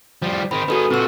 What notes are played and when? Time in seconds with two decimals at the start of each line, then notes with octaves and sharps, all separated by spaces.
0.22 F3 G3
0.51 D#3 C4 B5
0.68 D#3 F#4 G#4 A4 B4
0.91 A#2 C4 F#4 E6